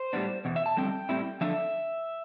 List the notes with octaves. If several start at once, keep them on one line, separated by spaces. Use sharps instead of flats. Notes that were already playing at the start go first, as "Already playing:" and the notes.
Already playing: C5
A2 G3 B3 D4
E2 B2
E5
A5
F2 D3 G3 C4 G5
A2 G3 C4 E4
D3 F3 A3 D4 E5